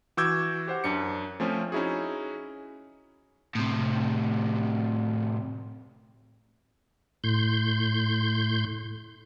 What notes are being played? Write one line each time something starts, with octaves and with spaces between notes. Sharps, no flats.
E3 F#4 D6 E6 G6 G#6
G4 C5 F#5
F#2 D4 C#7
F3 A3 C4 C#4 F4
C#4 D#4 E4 F#4 G#4
A2 C3
A2 C6 G6